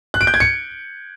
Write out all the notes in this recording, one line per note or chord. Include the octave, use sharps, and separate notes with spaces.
F#6
D7
G6
G#6
C#7